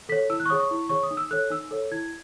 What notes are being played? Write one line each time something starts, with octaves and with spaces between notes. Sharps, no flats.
A4 C#5 B6
E4 E6
F#6
C#6
G#4 C#5 D#6
C#6
E4
G#4 C#5 C#6
D#6
D#4
E6
A4 C#5 F#6
D#4 E6
A4 C#5
E4 G#6